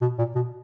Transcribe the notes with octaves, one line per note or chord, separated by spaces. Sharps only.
B2
A#2
B2